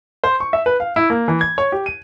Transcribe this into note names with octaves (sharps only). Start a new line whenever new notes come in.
C5
C#6
E5
B4
F5
E4
A#3
E3
G#6
C#5
G4
D#7